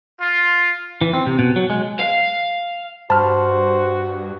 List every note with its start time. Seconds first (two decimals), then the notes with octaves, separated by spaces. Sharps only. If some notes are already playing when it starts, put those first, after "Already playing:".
0.21 F4
1.01 E3
1.14 C4
1.26 C3
1.39 B2
1.56 F#3
1.70 G#3
2.00 F5
3.10 G2 F#4 C5 A5 B5 F6